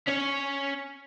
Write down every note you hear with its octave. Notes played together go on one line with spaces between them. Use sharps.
C#4 C#5